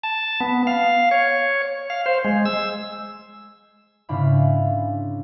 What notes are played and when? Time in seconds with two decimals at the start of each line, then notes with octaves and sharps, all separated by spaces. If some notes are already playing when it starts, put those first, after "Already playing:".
0.03 A5
0.40 B3
0.67 F5
1.11 C#5
1.90 F5
2.06 C5
2.25 G#3
2.46 E6
4.09 G#2 C#3 D4 E4 F5 B5